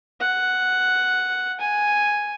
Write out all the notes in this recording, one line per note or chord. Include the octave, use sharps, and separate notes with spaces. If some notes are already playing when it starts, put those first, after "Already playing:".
F#5
G#5